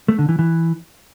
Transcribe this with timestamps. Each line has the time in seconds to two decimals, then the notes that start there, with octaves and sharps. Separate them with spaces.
0.08 A3
0.19 D3
0.29 E3
0.39 E3